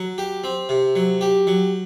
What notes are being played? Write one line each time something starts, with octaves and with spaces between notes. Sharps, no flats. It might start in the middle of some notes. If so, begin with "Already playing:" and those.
Already playing: F#3
G4
C4
C3
F#3
G4
F#3